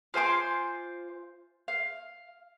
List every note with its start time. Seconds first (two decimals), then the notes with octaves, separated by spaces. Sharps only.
0.14 F4 C5 G#5 D6
1.68 F5